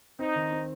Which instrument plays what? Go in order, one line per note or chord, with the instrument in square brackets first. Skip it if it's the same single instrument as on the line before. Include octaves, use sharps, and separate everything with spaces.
[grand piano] C4 [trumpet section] D#4
[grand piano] D#3
C4